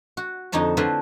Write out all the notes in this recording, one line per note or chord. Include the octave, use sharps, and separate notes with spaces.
F#4
F2 D3 D#4 C#5 A5
D3 A3 E4 F4 B4 C5